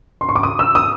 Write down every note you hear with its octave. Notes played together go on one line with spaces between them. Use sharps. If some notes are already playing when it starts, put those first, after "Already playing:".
C6
C#6
D6
D#6
E6
D#6